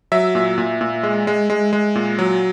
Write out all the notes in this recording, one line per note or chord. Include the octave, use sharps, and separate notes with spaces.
F#3 E5
A#2
A#2
A#2
G#3
G#3
G#3
G#3
A#2
F#3